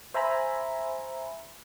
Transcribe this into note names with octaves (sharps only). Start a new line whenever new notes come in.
C5 E5 G#5 A#5 B5